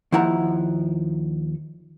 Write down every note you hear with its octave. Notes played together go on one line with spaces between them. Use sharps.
D#2 F3 E4 F#5 A#5